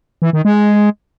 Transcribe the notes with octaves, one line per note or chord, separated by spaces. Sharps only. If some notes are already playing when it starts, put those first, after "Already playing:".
E3
D#3
G#3